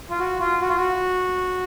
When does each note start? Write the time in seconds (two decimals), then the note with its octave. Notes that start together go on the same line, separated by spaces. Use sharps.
0.10 F4
0.19 F#4
0.40 F4
0.61 F#4
0.69 F4
0.76 F#4